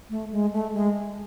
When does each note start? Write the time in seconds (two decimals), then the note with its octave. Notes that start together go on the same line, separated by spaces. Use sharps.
0.10 A3
0.31 G#3
0.53 A3
0.74 G#3